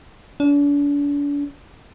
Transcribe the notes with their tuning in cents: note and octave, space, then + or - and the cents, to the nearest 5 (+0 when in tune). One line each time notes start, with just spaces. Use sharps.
D4 -40